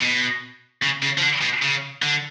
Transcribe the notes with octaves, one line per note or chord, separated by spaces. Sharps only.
B2
C#3
C#3
F3
D3
B2
C#3
D3